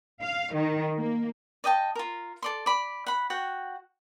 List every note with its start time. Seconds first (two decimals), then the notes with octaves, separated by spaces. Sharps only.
0.22 F5
0.55 D#3
0.97 A#3
1.64 D5 D#5 G5 A5
1.95 F4 A#4
2.42 A4 D5 C6
2.66 D5 B5
3.06 F#5 B5
3.30 F#4 F#5 G5